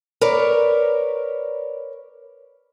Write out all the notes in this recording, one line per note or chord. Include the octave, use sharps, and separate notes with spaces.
A#4 B4 C#5 D5